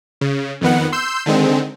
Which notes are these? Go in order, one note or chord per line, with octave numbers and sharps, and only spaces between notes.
C#3
F2 D#3 B3 F#5
C6 E6 G6
D3 D#3 G#3 C4